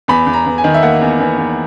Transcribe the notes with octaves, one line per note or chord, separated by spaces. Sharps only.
E2 B5
E2
A#5
E2
G#5
D#3
E5
A#3 F#5
E2
E2
E2